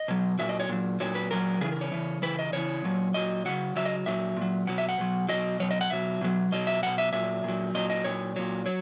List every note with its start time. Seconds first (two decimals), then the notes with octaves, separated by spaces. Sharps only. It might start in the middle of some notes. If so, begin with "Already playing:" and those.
Already playing: D#5
0.08 B2 F#3
0.39 A#2 F#3 E5
0.49 D#5
0.60 C#5
0.69 A#2 F#3
1.00 A#2 F#3 C#5
1.15 B4
1.31 A#2 F#3 A#4
1.61 C#3 E3 G#4
1.72 A#4
1.81 C#5
1.92 C#3 E3
2.22 C#3 E3 B4
2.39 D#5
2.53 C#3 E3 C#5
2.84 A#2 F#3
3.14 A#2 F#3 D#5
3.45 C#3 F#3 F#5
3.75 C#3 F#3 E5
3.86 D#5
4.06 A#2 F#3 E5
4.37 A#2 F#3
4.67 B2 F#3 F#5
4.78 E5
4.89 F#5
4.98 B2 F#3
5.29 B2 F#3 D#5
5.60 B2 F#3 C#5
5.71 D#5
5.81 F#5
5.90 B2 F#3 E5
6.21 B2 F#3
6.52 B2 F#3 D#5
6.67 E5
6.83 B2 F#3 F#5
6.98 E5
7.13 A#2 F#3 E5
7.44 A#2 F#3
7.74 A#2 F#3 D#5
7.90 D#5
8.04 A#2 F#3 C#5
8.36 A#2 F#3 C#5
8.66 F#3 C#5